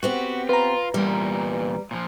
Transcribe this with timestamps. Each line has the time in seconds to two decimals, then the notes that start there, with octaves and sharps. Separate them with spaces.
0.03 B3 C4 F#4 G4
0.49 F4 B4 A#5
0.94 E2 A#2 G3 A#4
1.91 A#2 D#3 F3